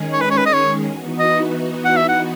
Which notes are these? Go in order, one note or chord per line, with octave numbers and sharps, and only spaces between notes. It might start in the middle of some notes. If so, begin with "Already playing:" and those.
Already playing: D#3 G#3 C#4 G#4
C#5
B4
C#5
B4
D#5
C#5
E3 B3 D#4 F#4
D#5
F#5
E5
F#5